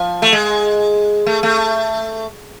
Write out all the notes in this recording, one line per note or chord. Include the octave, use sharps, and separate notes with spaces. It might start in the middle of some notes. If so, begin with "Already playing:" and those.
Already playing: F3
A3
G#3
A3
A3